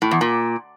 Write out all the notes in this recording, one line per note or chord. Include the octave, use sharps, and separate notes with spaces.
A2
E2
A#2